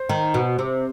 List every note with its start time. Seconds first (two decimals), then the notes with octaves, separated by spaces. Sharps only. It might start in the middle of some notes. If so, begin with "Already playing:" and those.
Already playing: C5
0.09 D#3
0.34 B2
0.59 C3